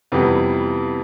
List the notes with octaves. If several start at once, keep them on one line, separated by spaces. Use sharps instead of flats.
F2 C3 E3 G3 B3